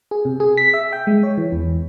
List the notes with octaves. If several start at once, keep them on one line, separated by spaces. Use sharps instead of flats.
G#4
C3
G#4
B6
E5
G5
G#3
C#5
E3
E2